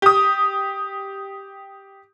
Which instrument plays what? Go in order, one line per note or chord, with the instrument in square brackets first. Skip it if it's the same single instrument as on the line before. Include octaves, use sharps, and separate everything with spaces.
[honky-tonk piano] G4 D#6